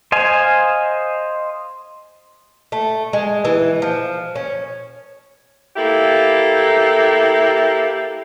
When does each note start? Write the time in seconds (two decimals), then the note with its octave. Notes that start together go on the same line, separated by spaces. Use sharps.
0.12 C5 D#5 F5 G#5
2.72 A3
3.13 G#3
3.45 E3
3.82 F3
4.35 C#4
5.77 A#3 E4 G4 A4